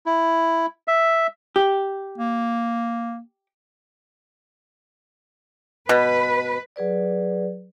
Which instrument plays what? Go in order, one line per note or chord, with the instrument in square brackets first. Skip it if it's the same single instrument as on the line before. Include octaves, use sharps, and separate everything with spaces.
[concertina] E4
E5
[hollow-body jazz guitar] G4
[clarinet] A#3
[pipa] B2 [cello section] B4
[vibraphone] F#3 G#4 B4 D5